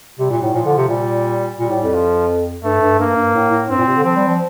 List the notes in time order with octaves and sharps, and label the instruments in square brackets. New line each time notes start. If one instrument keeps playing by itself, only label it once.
[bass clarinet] C3 [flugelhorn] G3
[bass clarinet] A#2
A2
[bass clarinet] A#2 [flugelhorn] F3
[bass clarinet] D3
C3
[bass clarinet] A#2 [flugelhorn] G3
[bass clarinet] A#2 [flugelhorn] G3
[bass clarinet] A2
F2
[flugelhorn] F3
[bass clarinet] G2 [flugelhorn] A3
[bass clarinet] G2
[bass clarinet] G2 [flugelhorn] A#3
[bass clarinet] G2
A2
A2
[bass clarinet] G2 [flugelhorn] C4
[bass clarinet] A#2
C3
D3
[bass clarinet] F3 [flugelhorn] C4
[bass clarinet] G3
F3